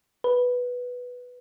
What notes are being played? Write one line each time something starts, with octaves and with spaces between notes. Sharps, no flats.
B4